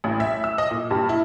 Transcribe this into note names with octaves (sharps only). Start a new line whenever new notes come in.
A1
E5
E6
D#5
A#2
G2
E4